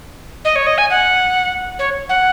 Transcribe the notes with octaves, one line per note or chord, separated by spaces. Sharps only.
D#5
C#5
D#5
G#5
F#5
C#5
F#5